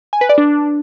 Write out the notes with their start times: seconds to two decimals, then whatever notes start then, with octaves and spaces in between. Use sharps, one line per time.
0.13 G#5
0.21 B4
0.29 D5
0.38 D4